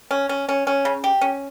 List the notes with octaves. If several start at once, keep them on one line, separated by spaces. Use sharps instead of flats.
C#4
C#4
C#4
C#4
C#3
G4
C#4